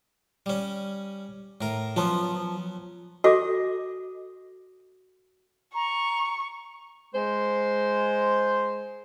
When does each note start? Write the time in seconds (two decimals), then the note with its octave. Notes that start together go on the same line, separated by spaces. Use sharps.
0.46 G3 C#4
1.61 A2 A#4
1.96 F3 F#3 B3 C#4
3.24 F#4 A4 D#5 D6
5.75 A#5 C#6
7.14 G#3 C5